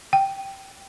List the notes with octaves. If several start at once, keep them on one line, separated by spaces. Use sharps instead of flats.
G5